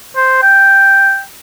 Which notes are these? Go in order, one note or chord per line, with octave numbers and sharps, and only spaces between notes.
C5
G5